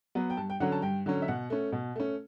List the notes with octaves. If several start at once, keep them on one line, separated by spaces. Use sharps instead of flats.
F#3 B3
G5
G2 A5
G5
D3 F#3 C#4 F#5
A5
G2 G5
D3 F#3 C#4
E5
B2 F#5
A3 C#4
B2
A3 C#4